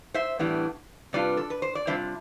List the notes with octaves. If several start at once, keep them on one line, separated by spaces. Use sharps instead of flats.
C5 E5
A2 E3 G3 B3 D4
C3 G3 D4 F4 B4 D5
A4
B4
C5
D5
C3 G3 D4 F4 C5 E5